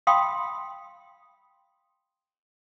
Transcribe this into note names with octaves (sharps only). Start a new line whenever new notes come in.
F5 G5 B5 C6 D#6